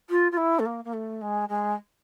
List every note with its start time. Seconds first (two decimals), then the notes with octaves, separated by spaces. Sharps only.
0.10 F4
0.32 F4
0.37 E4
0.59 A3
0.65 A#3
0.84 A#3
0.93 A3
1.21 G#3
1.49 G#3